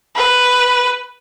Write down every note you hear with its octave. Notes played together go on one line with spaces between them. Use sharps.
B4